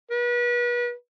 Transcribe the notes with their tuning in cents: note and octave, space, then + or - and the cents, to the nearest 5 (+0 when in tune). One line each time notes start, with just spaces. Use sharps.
B4 -35